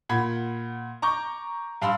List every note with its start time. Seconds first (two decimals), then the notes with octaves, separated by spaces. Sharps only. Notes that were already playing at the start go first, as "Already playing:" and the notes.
0.09 A#2 F#5 B5 G#6
1.02 A#5 C#6 D6 G6
1.82 G2 F5 B5 C6 E6